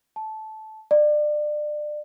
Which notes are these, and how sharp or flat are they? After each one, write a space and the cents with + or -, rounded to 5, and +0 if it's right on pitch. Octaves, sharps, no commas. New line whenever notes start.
A5 -15
D5 +30